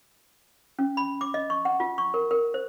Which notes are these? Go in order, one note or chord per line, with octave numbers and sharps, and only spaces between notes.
C#4
B5
D6
D#5
C#6
F#5
F4
C#6
A#4
A#4
C5